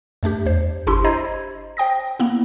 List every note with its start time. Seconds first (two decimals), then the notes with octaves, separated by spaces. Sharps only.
0.23 F#2 A3 D4 G4
0.46 E2 C5
0.87 G1 D4 E4 G4 C6 E6
1.04 C5 D#5 A#5 B5 G#6
1.77 C5 G5 D#6 A#6
2.20 A#3 B3 E4